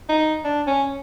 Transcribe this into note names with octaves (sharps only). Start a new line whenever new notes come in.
D#4
D4
C#4